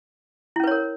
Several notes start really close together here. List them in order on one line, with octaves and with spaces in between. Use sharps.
E4 C#4 B4 C#5 A#4